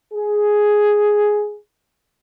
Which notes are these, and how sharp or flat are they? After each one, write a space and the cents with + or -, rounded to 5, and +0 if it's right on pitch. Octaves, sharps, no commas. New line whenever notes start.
G#4 +5